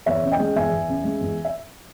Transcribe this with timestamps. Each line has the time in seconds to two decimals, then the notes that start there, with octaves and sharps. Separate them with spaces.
0.06 E2 C#5 E5
0.23 C#3
0.32 D#5 G5
0.39 G#3
0.56 E2 E5 G#5
0.72 E2
0.88 C#3
1.04 G#3
1.21 E2
1.45 E5